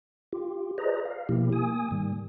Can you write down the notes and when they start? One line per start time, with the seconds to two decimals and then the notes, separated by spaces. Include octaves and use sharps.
0.33 F4 G4
0.78 G#4 B4 C5 D5 D#5 A#5
1.05 F5
1.29 B2 F3 A#3 E4 G4
1.52 A#3 G#5 D#6
1.91 G#2 D#3 G3